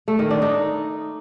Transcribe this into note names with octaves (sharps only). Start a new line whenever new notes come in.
A3
D#3
D4
D#4